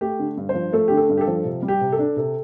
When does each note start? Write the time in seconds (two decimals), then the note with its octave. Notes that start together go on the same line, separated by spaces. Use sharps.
0.01 A3 G4
0.19 D3
0.38 G2
0.49 C5
0.54 F3
0.73 A3 A4
0.88 D3 G4
0.97 A4
1.09 G2
1.17 G4
1.21 A4
1.27 F3
1.45 C3
1.62 G3
1.68 G4
1.81 C3
1.92 A4
1.99 D4
2.16 C3 A4